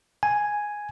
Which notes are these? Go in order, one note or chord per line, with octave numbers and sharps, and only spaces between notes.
G#5